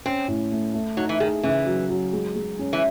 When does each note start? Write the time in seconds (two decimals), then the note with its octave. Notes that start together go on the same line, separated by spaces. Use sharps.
0.05 C4 C#4
0.28 A2
0.52 A3
0.74 A3
0.97 F#3 D#4
1.09 E3
1.20 D#3 G#4
1.43 C#3 E3
1.66 F#3
1.90 F#3
2.13 G#3
2.36 G#3
2.59 C#4
2.73 E3